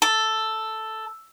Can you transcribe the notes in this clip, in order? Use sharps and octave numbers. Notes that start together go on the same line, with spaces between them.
A4